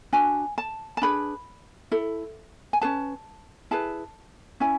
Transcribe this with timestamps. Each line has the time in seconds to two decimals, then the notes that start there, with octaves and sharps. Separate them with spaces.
0.13 D4 F#4 G#5
0.58 A5
0.97 A5
1.02 D4 G#4 B4 B5
1.91 E4 A4
2.73 G#5
2.81 C#4 G#4 B4 A5
3.71 E4 G#4 B4 A5
4.60 C#4 E4 G#5